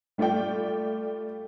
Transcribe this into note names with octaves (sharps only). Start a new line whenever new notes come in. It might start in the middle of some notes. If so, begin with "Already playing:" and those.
G3 A3 F4 D5 G5